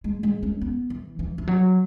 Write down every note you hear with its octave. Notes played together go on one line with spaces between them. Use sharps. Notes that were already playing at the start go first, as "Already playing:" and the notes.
G#3
G#3
C#4
B3
E3
E3
E3
F#3